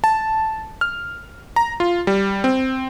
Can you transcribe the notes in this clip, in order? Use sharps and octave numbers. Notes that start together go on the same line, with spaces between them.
A5
F6
A#5
F4
G3
C4